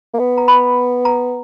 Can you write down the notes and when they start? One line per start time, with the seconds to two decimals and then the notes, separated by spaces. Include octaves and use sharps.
0.14 A#3
0.19 B3
0.38 A#5
0.48 B5
1.05 A#5